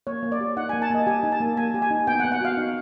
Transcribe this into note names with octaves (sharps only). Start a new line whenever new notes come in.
A#3 C#5
A#3
D5
G4
D#4 F#5
A#3 G#5
A5
A#3 D#5
G4 G#5
D#4
A5
A#3
A#3 G#5
G4
G#5
D#4
B3 G5
F#5
B3
F#5
F#4 F5
D#4